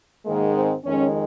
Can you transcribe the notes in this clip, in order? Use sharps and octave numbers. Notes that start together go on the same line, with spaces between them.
G#2 D#3 G#3 A#3
C4
F2 D#3 G#3 C#4